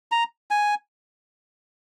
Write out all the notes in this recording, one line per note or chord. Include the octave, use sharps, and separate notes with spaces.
A#5
G#5